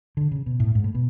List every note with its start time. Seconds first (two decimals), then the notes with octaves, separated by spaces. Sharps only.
0.17 D3
0.31 C#3
0.46 B2
0.60 A2
0.75 G#2
0.84 A2
0.95 B2